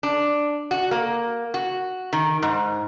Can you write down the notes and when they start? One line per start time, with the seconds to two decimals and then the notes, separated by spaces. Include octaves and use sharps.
0.03 D4
0.71 F#4
0.91 A#3
1.54 F#4
2.13 D#3
2.42 G#2